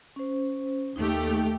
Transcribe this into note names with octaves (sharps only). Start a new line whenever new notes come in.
C#4 C5
D#2 A3 D#4 G4